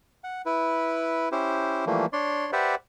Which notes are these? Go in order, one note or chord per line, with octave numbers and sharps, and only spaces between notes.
F#5
E4 B4
C#4 E4 G4 C5
E3 F3 G3 A3 A#3
D4 C#5 D5 C6
G4 B4 C5 D5 E5 F#5